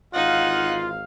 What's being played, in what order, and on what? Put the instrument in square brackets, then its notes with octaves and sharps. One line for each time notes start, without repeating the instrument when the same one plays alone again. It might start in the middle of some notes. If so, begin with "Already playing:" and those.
[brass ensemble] G#1 E3 F5 [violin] D#4 F#6 [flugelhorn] F4 [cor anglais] F#5